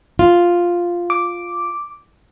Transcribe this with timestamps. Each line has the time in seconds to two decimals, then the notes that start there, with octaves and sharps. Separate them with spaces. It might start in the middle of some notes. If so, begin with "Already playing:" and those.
0.19 F4
1.10 D6